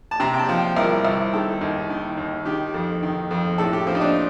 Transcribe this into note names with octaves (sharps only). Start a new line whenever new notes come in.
A5
C3 A#5
G5
A5
F3
G5
C2 A#4
C2
D#3 A4
D#2
D#3
D#2
D#3 G4
F2
D#3
F2
A2 A4
G4
F3 C4
D#4
D4